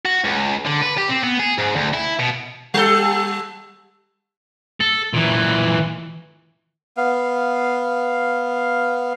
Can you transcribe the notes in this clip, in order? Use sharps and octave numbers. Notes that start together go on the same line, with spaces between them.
F#4
C#2
D3
B4
G4
C4
B3
G#4
G#2
D2
E4
B2
G3 A4
A4
A#2 E3
B3 F5